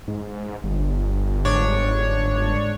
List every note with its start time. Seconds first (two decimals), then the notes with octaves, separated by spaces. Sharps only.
0.08 G#2
0.64 G1
1.45 G#2 D4 C#5